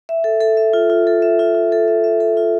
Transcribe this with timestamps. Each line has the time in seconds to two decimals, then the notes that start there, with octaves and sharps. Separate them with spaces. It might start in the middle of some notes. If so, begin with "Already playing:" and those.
0.09 E5
0.24 A4
0.41 A4
0.57 E5
0.73 F4
0.90 F4
1.07 A4
1.22 E5
1.39 F4
1.55 F4
1.72 A4
1.88 E5
2.04 E5
2.20 A4
2.37 F4